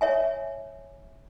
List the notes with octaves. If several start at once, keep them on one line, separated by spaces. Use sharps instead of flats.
C#5 E5 G#5